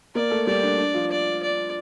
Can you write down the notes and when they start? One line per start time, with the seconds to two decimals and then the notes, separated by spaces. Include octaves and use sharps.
0.15 A#3 A#4 D5
0.31 A3 A4
0.47 G3 G4 D5
0.63 D4
0.78 D4
0.94 F3 F4
1.11 D5
1.43 D5